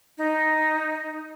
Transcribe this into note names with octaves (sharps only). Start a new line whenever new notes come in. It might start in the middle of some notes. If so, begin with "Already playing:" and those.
D#4